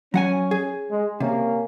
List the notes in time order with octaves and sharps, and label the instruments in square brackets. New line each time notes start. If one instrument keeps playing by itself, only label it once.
[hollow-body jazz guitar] F#3 F#5 G#5 [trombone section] C#4
[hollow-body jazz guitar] G#4
[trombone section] G#3
[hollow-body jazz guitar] C3 [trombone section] A#3 C#4